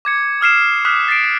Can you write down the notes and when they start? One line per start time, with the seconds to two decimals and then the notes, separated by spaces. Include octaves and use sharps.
0.05 D6 G#6 C#7
0.41 D#6 F6 C7 E7
0.85 D6 D#6 F6 F#6 B6
1.08 A6 B6 C7 D7